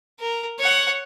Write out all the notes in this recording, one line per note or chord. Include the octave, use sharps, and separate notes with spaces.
A#4
C#5 F#5